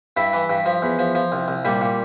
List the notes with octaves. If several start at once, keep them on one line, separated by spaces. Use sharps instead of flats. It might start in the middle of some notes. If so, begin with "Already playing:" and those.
G2 E4
E3
G2
F3
E2
F3
F3
C2
C2
A#2 G3
A#2